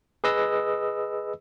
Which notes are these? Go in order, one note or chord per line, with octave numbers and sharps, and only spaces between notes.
G#4 B4 D#5 E6